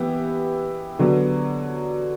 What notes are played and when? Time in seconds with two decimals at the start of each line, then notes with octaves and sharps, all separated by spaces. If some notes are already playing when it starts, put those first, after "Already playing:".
Already playing: E3 B3 E4 G4
0.99 D3 F#3 B3